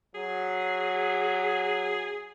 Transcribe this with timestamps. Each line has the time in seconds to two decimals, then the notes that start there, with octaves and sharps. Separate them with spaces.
0.15 F#3 G#4